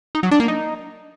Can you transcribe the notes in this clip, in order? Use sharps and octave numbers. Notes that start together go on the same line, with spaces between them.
D#4
F#3
D4
A#3
D#4